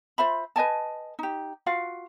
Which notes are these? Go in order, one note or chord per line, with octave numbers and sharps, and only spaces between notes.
F4 C5 E5 B5
B4 D#5 G#5 A5
D#4 G4
F4 F#4 F5